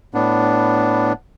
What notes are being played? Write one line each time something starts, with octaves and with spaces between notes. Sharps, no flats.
A2 B3 D4